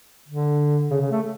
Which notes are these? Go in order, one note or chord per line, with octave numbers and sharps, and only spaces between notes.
D3
C#3
C#3
A3